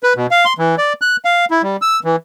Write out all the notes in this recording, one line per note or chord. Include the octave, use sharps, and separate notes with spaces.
B4
B2
F5
C6
E3
D5
F#6
F5
E4
G3
E6
E3